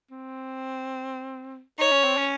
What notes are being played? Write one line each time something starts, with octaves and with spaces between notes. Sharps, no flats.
C4
D#4 C#5
C#4
C4
C#4